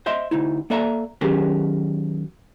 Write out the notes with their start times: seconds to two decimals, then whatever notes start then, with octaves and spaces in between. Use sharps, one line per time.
0.06 C5 D#5 E5 C6
0.31 D2 D#4 E4
0.70 A#3 A4 D5 E5 F5 A#5
1.21 D#3 F#3 C#4 G4 G#4 A#4